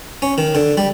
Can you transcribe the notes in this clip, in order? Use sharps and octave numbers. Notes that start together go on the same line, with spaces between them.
C#4
D#3
D3
G3